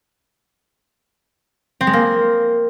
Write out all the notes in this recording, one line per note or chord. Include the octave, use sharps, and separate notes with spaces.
C4
G#3
A#3